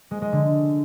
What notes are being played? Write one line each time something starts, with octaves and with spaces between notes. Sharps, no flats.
G#3
G#3
D3